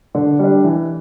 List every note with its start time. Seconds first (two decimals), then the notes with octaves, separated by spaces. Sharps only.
0.15 D3
0.39 G3 D4
0.64 E3